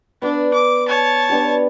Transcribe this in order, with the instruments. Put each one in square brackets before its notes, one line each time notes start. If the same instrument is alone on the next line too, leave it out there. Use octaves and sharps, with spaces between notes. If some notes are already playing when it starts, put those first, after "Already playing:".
[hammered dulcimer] B3 D5 [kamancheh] D4
[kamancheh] D6
C#5 A5
[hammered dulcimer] B3 D4 G4